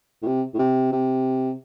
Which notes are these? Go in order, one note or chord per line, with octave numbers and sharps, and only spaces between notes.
A2
C3
A2
C3
C3